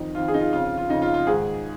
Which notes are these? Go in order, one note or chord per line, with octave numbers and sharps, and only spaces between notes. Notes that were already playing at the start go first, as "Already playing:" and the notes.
Already playing: F2 D#3 D#4
F2 D#3 F4
G#4
D#4
F4
F2 C#3 F4
F4
F4
F2 C#3 D#4
F4
F4
G#2 D#3 G#4